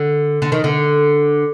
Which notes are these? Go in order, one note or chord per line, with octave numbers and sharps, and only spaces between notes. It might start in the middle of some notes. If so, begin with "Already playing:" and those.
Already playing: D3
D3
D#3
D3